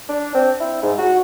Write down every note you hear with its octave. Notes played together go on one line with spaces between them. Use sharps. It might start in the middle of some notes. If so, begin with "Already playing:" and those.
D4
C4
E4
G#2
F#4